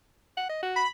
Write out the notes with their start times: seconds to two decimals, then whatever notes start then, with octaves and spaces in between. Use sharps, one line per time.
0.37 F#5
0.49 D#5
0.63 F#4
0.76 B5